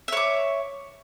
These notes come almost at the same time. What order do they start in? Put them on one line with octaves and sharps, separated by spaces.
E5 C#5 D6